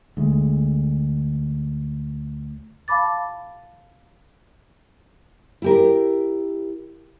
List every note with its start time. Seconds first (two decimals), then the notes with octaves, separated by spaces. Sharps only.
0.17 D2 G#3
2.88 F5 A5 B5 D6 A6
5.62 E4 G4 A#4